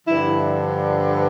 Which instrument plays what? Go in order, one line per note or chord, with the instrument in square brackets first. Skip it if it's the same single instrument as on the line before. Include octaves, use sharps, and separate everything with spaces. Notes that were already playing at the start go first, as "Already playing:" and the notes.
[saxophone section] G2 D3 F3 E4